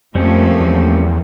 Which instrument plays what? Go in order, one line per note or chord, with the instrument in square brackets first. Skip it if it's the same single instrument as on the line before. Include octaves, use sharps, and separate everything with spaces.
[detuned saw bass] F2 [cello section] F3 A3 A#3 [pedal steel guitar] G3 C4 C#4
[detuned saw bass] E2